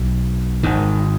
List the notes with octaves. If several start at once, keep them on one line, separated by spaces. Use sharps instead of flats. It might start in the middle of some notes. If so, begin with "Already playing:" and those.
Already playing: B1
G#1 G#2 D#3